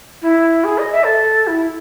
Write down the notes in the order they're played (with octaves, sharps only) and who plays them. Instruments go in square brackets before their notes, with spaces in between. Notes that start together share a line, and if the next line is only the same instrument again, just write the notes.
[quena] E4
G#4
D#5
E5
A4
E4